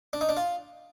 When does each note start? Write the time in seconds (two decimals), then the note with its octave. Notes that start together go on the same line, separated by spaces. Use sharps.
0.13 D4
0.21 D#4
0.29 D4
0.37 F4